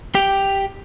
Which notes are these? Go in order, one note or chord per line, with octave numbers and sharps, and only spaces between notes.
G4 G5